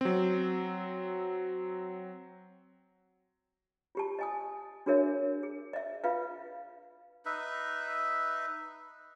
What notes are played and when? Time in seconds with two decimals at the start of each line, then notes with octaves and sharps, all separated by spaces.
0.01 F#3 C4
3.95 F4 G4 A5
4.19 D#5 G#5 D#6
4.86 D4 F#4 G#4 A#4 C#5 E5
5.43 G#4
5.73 D#5 E5
6.04 F4 B4 E5 F5
7.26 D#4 B4 E5